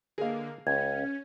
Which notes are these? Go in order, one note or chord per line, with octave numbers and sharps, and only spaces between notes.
D3 A#3 G#4 A#4 D#5 F5
C#2 C#4 G#6